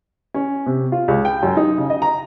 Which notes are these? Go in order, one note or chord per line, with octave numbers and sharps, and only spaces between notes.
C#4
C3
F4
C#2
G5
F#2
D#4
C#3
D#5
A#5